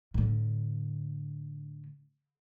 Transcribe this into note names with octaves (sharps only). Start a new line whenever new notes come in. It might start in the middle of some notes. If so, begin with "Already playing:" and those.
A2 D3